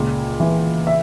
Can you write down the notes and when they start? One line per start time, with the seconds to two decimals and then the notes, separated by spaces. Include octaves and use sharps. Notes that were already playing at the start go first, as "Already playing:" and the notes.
Already playing: C#2 A#2
0.40 E3
0.87 E5